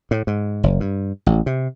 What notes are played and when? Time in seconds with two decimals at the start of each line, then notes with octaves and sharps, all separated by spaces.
0.11 A2
0.27 G#2
0.63 F#1
0.80 G2
1.26 A1
1.46 C3